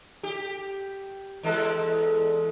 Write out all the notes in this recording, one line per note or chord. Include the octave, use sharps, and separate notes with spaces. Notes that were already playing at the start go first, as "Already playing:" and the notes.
G4
E2 G#3 A4